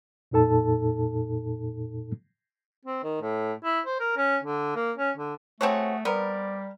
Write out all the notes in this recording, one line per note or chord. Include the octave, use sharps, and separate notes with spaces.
F2 A#2 D#4 A4 A5
C4
D#3
A2
E4
C5
A#4
C#4
D3
A#3
C#4
D3
A3 C4 F#4 G#4 A4 C#5 F#5
G3 B3 C4 A#4 D5